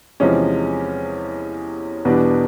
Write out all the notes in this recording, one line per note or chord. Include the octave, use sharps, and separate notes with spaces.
E2 C3 F3 G#3 C#4
E2 B2 G3 B3 D4